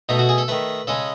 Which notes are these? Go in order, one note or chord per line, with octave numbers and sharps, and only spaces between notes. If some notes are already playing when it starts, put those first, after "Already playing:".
B2 A3 D#4
F#4
G#4
A4
D#3 A3 B4
C#3 G#3 A4